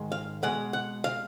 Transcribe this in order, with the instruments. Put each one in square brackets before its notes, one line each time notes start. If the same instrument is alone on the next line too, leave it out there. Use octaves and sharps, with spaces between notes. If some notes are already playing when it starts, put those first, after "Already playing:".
Already playing: [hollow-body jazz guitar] G#2 D#3 G#3
F5
B2 G#3 F#5
F#5
F5